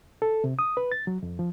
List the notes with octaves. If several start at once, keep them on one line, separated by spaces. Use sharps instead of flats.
A4
C3
D#6
B4
A6
F#3
F2
F3